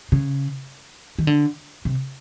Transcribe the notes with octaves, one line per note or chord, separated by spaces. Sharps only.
C#3
D#3
D3
C3